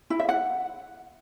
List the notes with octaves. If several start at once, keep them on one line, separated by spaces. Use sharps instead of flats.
E4
E5
F#5